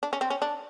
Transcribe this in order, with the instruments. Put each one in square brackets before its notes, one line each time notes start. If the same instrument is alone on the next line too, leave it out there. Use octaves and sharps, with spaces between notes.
[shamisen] D4
C#4
C4
C#4
D4